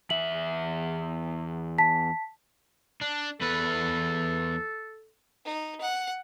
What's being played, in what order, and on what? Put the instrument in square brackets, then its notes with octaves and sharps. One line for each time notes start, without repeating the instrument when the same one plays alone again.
[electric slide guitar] E2 E5 [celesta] F#7
[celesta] A5 B6
[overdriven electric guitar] D4
[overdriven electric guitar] E2 B4 [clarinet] A4
[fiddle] D#4
F#5